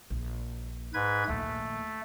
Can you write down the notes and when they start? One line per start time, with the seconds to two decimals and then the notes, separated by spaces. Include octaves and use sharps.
0.10 A#1
0.94 G#2 B4 G#6
1.28 A#1 D#2 A3